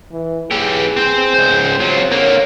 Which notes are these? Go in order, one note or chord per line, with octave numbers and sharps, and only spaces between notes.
E3
E3 G4 G#4
C4 C5
C#2 C5
F#3 C4 F4
D3 A#3 C#5